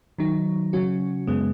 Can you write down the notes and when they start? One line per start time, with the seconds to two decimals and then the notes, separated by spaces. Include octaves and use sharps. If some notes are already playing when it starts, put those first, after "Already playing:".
0.18 D#3 F#3 D#4
0.73 C#3 F#3 C#4 F#4
1.27 F#2 C#3 G#3 B3